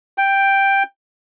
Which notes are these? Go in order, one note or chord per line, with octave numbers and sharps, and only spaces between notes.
G5